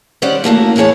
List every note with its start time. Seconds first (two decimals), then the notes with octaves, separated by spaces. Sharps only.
0.22 D#3 G3 C#4 C5 D5 F#5
0.44 E2 A3 A#3 F#4
0.76 A2 E3 G#4 C#5 A5